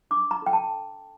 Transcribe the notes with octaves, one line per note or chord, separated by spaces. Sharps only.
D4 D6
A#5
A4 G5
A5